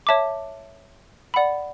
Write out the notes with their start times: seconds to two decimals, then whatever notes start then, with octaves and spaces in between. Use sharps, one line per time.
0.07 C#5 E5 A5 D6
1.34 D5 F#5 B5